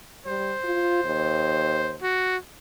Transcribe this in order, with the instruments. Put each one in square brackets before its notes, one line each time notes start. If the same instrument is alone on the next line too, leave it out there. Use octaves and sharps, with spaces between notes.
[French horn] G3 [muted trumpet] C5
[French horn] F4
D#2
[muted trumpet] F#4